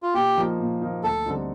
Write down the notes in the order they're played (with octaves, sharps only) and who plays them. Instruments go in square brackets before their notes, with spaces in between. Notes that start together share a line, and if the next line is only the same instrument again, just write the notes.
[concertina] F4
[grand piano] A#2 [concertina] G4
[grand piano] F3 A#3 D#4
A#2
F3 A#3 D#4
[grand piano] D2 [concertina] A4
[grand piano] D3 G3 C4 D#4